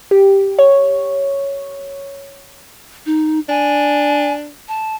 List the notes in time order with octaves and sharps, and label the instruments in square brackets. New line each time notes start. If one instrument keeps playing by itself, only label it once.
[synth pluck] G4
C#5
[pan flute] D#4
[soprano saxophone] D4 [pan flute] G#5
[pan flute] A5